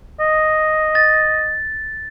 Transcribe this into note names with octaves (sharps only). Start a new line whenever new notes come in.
D#5
A6